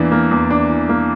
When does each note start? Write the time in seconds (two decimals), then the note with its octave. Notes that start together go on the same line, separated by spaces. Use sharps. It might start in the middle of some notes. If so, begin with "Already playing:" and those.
Already playing: E2 E3 A#3 D4
0.12 A#3
0.31 E2
0.50 D4
0.70 E3
0.89 A#3